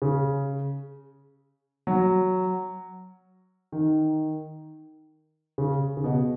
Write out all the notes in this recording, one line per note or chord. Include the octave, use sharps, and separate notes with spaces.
C#3
F#3
D#3
C#3
C#3
B2